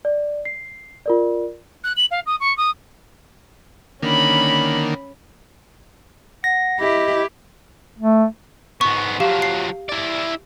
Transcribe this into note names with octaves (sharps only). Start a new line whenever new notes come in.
D5
C7
F4 A#4 D5
F#6
F#7
F5
D#6
C#6
D#6
D3 D#3 A#3 C#4 B5
F#5 A#6
E4 G4 D#5
A3
G#2 B3 C#6
F3 F#3 G4 F5
C7
E4 D5